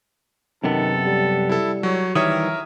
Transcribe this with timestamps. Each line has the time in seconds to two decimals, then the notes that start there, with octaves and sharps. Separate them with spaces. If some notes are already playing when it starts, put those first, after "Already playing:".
0.64 F#2 C3 D#3 B3 A4
1.06 G3
1.49 E4 A4
1.83 F#3 C#5
2.15 D#3 E3 G3 A#4 C#5 E5 D#6